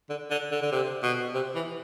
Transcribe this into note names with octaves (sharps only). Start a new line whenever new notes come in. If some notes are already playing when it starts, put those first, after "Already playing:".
D3
D3
D3
D3
C3
B2
C3
E3